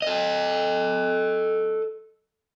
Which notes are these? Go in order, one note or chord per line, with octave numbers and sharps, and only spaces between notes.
A4 D#5